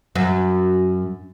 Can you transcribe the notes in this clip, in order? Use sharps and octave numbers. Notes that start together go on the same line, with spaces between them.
F#2